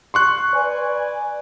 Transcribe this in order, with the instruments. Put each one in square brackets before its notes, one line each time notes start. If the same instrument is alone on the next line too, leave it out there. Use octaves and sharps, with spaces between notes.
[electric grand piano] C6 C#6 F#6
[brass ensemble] B4 D5 G#5